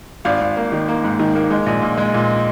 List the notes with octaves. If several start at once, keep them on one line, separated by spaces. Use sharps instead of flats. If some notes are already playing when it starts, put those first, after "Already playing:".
G#1 D5 F5
G#1
A#3
D#3
A#3
G#2
D#3
A#3
G#3
A#1
A#2
G#3
A#2